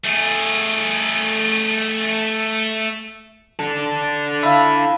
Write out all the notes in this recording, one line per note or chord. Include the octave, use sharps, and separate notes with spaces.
A3 G#4
D4 A4
E4 F4